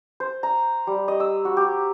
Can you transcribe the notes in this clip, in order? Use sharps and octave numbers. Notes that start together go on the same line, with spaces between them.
C5
A#5
G3
D#5
E6
F#4
G4